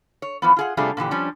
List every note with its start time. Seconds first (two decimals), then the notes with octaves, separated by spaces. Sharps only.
0.22 C#5
0.42 E3 F3 B3
0.56 F4 G#4 F#5
0.77 C3 G3 A3 D4 F4 G#4
0.97 A#2 D3 E3 G4
1.11 F3 G3 C#4 D4